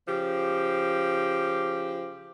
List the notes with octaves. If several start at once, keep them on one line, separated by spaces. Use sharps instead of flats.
C#3 F3 G4